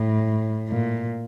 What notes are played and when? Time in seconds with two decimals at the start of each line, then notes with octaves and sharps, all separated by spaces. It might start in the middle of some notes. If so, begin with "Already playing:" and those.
Already playing: A2
0.69 A#2